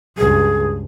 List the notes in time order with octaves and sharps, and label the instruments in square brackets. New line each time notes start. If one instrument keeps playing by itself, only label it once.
[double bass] C#2 G2 [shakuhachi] G#4